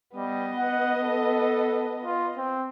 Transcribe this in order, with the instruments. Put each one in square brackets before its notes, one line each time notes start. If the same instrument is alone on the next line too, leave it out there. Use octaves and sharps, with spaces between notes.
[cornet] G3 [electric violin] B3 D#5
[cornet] F#5
A4
F4
C4